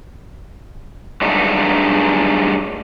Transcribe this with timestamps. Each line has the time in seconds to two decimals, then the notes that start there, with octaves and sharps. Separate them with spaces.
1.22 G2 F#3 G#3 A3 D4 D#4